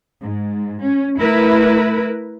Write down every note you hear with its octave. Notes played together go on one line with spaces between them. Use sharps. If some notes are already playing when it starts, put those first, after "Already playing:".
G#2
C#4
A3 E4 A#4 B4